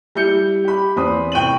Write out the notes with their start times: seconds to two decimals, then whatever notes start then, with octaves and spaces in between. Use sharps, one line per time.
0.15 G3 E4 G6 C#7
0.65 G4 B5
0.96 E2 C4 B5 D#6
1.32 C2 G5 C#6 D#7 F#7